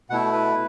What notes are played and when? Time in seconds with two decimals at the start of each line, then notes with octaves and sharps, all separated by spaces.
0.10 B2 A3 E4 F#5
0.33 B4